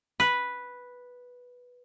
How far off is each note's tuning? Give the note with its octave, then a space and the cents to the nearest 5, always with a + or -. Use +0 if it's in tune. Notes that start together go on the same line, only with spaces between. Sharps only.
B4 -5